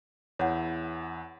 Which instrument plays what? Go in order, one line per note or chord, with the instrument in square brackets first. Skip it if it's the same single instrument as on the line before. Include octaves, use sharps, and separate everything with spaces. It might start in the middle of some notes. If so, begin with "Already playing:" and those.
[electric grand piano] E2 E4 [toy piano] C#5 F#5